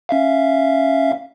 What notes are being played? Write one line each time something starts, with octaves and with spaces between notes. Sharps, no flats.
C#4 E5 F5